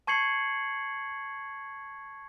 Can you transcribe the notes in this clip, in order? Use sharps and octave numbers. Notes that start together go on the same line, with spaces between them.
A5 C#6 G#6 C7 C#7 F#7